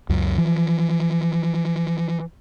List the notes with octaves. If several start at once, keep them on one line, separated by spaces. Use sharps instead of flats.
C#2 F#2
E3 F3